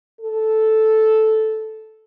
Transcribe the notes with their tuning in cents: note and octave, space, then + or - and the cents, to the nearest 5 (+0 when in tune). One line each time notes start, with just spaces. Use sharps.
A4 -5